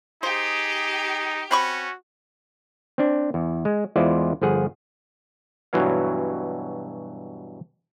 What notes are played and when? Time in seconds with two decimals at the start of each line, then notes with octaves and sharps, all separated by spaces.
0.23 D#4 G4 G#4 C5
1.51 C4 C#4 F#4 B5 C#6
2.98 C4 D4
3.34 E2
3.65 G#3
3.96 E2 G#3 E4 F4 C5 D5
4.42 G1 F3 G#4 F#5
5.73 G2 B2 E3 F#3 C#5 F5